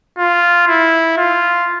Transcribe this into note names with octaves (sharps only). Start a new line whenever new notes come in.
F4
E4
F4